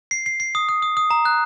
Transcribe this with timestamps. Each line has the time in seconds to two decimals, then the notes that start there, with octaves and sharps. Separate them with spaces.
0.11 C7
0.26 C7
0.40 C7
0.55 D#6
0.69 D#6
0.82 D#6
0.97 D#6
1.11 A#5
1.25 F#6